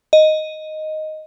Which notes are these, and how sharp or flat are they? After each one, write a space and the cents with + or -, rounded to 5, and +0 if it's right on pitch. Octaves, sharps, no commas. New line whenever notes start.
D#5 +0